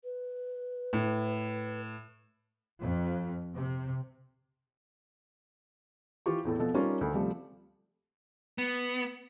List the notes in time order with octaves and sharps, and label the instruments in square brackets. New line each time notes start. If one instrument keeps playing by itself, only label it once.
[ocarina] B4
[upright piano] A2
[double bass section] F2
C3
[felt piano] E3 F4 G4 C#6
E2 A2 A4
B2 F3 A4
G3 C#4 D#4 F4 G4 A#4
D2
C3 F3 G3 A3
[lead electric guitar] B3